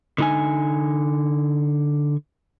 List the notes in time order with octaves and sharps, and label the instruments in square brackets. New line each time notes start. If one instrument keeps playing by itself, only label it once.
[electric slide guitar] D3 D#4 G#5